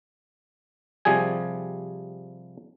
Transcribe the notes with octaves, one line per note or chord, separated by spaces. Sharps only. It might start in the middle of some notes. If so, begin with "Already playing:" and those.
C3 F3 G3 G#4 G#5